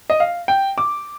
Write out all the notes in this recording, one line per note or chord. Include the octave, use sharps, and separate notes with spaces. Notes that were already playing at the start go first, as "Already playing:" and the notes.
D#5
F5
G5
D6